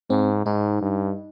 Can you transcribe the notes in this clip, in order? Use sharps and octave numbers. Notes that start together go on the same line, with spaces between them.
G#2 C4
G#2 D#4
G2